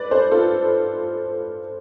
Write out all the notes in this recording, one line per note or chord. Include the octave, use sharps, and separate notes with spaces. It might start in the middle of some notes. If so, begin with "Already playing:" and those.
Already playing: B4 D5
A4 C5
F4 A4